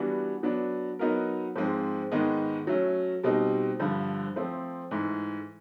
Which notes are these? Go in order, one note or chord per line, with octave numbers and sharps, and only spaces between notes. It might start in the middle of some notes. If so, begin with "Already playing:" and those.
Already playing: E3 G3 B3 D4 F#4
F#3 B3 D4
F#3 B3 D#4 F#4 A#4
G#2 F3 G#3 C4
G#2 D#3 G#3 B3 D#4
F#3 A3 C#4
B2 G3 C4 D#4
G2 D3 F3
F3 A3 C4
G#2 E3 A3